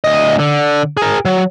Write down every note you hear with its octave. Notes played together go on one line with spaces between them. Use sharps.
D2 D#5
D3
G#4 A#4
F#3